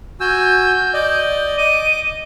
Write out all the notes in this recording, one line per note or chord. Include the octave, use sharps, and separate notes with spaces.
F#4 G#5 E6 G6
D5 D#5
D#5 D6 D#7